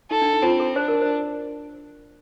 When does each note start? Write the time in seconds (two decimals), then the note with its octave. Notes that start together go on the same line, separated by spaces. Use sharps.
0.11 D#4 A4
0.22 D4
0.33 D#4
0.43 C4 F4
0.60 A4
0.76 D4 C5
0.88 A#4
1.02 C5